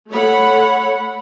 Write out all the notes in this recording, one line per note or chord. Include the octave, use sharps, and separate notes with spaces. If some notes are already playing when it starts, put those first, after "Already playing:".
A3 A4 C#5 F#5 B5